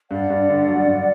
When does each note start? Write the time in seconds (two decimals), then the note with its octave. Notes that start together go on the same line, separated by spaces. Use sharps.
0.10 G2 D5 F#5
0.30 G2
0.49 D3
0.68 F#3
0.87 G2